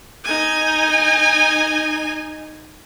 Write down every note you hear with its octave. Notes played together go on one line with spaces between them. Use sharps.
D#4 G#5